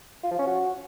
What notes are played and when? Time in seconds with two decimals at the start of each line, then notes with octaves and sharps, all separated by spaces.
0.23 F4
0.31 F3
0.39 C#4
0.47 F#4